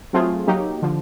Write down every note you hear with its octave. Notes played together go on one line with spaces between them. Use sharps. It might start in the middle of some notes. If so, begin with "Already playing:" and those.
F#3 A3 C4 F4 G#4
F#3 A#3 D#4 G4
D3 F3